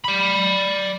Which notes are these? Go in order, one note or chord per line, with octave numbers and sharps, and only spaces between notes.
D5 B5